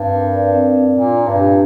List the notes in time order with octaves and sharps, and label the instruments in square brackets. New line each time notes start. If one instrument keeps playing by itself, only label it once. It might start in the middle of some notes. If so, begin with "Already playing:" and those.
Already playing: [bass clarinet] G2 [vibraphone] C4 F5
[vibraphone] A#4
D5
C4
F5
[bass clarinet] A#2 [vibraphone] D4
[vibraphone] D4
[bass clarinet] G2
[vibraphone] G4